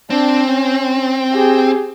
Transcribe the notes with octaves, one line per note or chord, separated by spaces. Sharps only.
C4 D4
C#4
G4 G#4